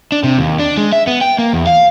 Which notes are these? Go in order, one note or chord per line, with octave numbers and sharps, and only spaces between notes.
D4
C3
D#2
D4
G#3
E5
B3
G5
A#3
E2
F5